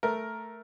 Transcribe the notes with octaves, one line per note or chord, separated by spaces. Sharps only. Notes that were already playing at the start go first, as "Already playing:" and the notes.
A3 A#4